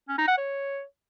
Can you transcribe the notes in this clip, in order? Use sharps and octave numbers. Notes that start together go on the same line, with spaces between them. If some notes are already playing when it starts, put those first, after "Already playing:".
C#4
D#4
F#5
C#5